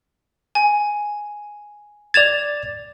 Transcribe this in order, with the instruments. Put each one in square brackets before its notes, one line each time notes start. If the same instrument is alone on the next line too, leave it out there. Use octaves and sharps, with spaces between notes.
[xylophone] G#5
[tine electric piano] D5 A6 [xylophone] G#6 E7 F7